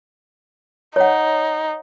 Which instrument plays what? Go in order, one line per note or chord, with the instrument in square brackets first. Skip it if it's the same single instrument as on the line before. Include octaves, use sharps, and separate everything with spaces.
[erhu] D#4 [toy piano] C#5 F#5